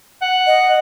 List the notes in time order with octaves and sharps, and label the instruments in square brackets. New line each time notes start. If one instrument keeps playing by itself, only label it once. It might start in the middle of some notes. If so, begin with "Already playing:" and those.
[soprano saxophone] F#5
[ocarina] D#5